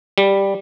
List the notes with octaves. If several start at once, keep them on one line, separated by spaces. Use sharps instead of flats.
G3